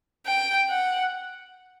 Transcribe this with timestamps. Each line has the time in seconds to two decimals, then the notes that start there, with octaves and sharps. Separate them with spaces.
0.26 G5
0.69 F#5